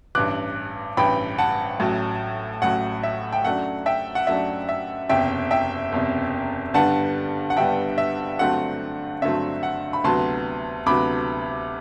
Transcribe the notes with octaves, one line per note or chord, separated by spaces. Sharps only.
A1 G2 E3 D6 F#6
A1 G2 E3 G5 B5
F#5 A5
A1 A2 F#3
A1 A2 F#3 F#5
E5
G5
F#2 F#3 A3 D4 F#5
E5 G5
F#5
F#2 F#3 A3 D4 E5
E5
F#1 E2 C3 E5 G5
E5 G5
F#1 E2 C3
G2 D3 G3 B3 F#5 A5
F#5
G2 D3 G3 B3 E5 G5
E5
G2 D3 F#3 A3 C4 F#5
G2 D3 F#3 A3 C4 E5
F#5
B5
D2 C3 F#3 B3 A5 C6
D2 C3 F#3 B3 B5 D6